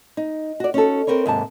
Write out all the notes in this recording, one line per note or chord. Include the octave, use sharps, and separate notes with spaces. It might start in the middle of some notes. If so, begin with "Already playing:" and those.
D#4
F#4 D5
C#4 D#4 F#4 A4
C4 A#4 B4 C#5
D#2 G#2 C3 A5